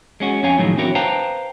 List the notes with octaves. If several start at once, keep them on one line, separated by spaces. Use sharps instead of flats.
G#3 C#4 F#4
F2 C#4 C#5 F5 G#5
A2 D#3 F3 F#3 G#3
C4 D4 E4 F#4 A#4 C#5
B4 C5 F5 G5 A5 A#5